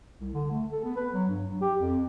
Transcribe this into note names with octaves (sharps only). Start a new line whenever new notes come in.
C2
D3
A3
A4
B3
B4
F#3
G2
F#3
G4
F2